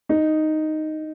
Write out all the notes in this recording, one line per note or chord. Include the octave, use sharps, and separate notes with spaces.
D#4